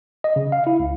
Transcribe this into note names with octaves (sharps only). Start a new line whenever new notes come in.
D#5
C#3
F5
E4
C#2